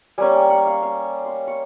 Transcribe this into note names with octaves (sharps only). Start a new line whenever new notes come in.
G3 A#3 C#4 G#5
G5
F#5
F5
F5
C6
C#6